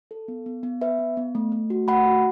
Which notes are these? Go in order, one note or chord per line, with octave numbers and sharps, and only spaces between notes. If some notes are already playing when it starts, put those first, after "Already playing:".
A4
B3
B3
B3
B3 B4 E5
B3
B3
A3
A3
F#4
A3 F#5 B5
F#4